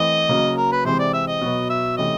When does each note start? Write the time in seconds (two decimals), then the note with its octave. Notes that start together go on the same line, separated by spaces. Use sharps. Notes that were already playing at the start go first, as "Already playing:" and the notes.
Already playing: E3 A3 C4 D#5
0.29 C#3 F#3 A#3
0.57 A#4
0.72 B4
0.85 C3 E3 G#3 C4 C5
0.99 D5
1.13 E5
1.28 D#5
1.41 B2 F#3 B3
1.70 E5
1.97 C3 E3 A3 C#4 D#5